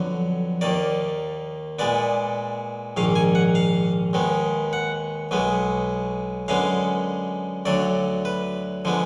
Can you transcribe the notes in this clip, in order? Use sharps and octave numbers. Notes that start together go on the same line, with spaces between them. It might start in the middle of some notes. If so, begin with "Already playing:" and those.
Already playing: F2 D3 F#3 B3
D#2 D#3 A#3 D5
A#2 G#3 B3 D5
A#1 G#2 D#3 F5
G#5
F#5
F5
D#2 D#3 G#3 B3
F#5
B1 B2 G#3 B3
F#2 D3 G#3 B3 F5
D2 D3 F#3 D5
B4
D3 F3 G#3 B3